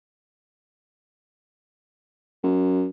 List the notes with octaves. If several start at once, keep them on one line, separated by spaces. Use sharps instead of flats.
F#2